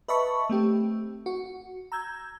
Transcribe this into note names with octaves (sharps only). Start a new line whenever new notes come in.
B4 D#5 E5 A5 B5 C#6
A3 C4 G4
F#4
A#5 E6 G6 G#6